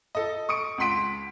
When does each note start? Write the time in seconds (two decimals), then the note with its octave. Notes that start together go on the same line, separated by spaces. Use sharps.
0.15 A4 D#5
0.49 C#6 D#6 C#7 D7
0.78 C#2 F#5 C6 B6 D7